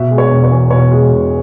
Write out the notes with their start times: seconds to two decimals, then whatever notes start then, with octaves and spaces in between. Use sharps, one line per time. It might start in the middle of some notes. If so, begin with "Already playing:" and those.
Already playing: B2 E5
0.11 G#3
0.18 C#5
0.30 E1
0.44 C#5
0.51 E2
0.70 B2 C#5
0.91 G#3
1.10 E1